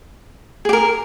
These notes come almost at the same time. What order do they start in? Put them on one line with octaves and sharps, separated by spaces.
G#4 G4 A#4